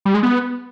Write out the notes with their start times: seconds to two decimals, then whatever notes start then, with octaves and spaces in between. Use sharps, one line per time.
0.05 G3
0.14 G#3
0.23 B3